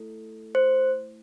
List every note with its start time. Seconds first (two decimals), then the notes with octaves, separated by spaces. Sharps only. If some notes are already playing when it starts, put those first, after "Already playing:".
Already playing: A3 E4 A4
0.55 C5